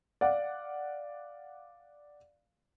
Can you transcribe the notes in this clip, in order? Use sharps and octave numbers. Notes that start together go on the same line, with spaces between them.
D5 F5 F#5